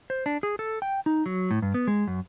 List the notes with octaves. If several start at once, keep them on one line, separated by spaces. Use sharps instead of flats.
C5
D4
G#4
A4
G5
D#4
F#3
A2
G2
B3
G#3
F#2